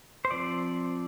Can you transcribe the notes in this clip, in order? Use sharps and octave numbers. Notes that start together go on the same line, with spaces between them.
C5
F3 C4 D5